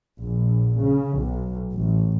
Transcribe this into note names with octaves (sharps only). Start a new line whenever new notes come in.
A#1
C#3
B1
A1